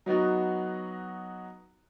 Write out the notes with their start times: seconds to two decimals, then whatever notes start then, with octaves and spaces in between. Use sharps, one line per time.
0.06 F#3 B3 D#4 F#4